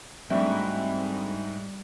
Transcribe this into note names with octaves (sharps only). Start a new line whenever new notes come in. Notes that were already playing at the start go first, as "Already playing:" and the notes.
G#2 G3 A3 C4 D4 E4 F#4